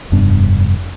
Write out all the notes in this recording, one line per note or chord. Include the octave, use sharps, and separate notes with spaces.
F1 G2 B3 D4